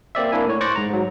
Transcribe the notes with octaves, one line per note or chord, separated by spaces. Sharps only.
A#3 C4 D5 E5
A#3 D4 E4 G#5
A2 C#5
C5 C#6 D6 F#6 A6 A#6
G#2 A#5
G#2 F#3